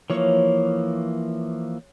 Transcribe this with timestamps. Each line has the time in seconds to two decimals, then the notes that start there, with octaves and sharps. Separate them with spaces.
0.10 E3 F3 A#3 C#5